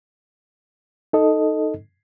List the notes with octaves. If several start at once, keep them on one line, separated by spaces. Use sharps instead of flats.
D#4 A4 D#5